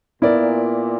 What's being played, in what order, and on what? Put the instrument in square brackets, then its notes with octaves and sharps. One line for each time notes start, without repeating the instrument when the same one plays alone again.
[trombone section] A#2 [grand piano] B3 E4 A#4 D5